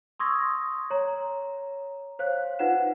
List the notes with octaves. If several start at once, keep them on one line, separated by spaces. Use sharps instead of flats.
C6 C#6 D#6 E6 G#6 A#6
C#5 A#5
C5 C#5 F5 F#6
D#4 F4 B4 F#5 E7